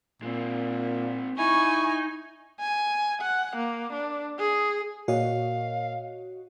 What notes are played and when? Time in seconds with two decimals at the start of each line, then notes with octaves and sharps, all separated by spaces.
0.22 A#2 G#3 C4
1.38 D#4 E4 G#5 C#6
2.60 G#5
3.22 F#5
3.56 A#3
3.93 D4
4.39 G#4
5.08 A#2 F#4 C#5 D#5 F5